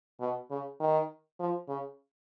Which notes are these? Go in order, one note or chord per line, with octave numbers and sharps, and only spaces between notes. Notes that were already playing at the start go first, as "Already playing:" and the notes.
B2
C#3
D#3
F3
C#3